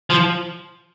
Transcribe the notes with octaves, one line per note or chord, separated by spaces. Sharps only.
F3